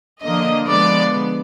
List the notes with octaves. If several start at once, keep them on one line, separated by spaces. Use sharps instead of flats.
D3 F3 A#3 D#5
D3 F3 G#3 B3 D5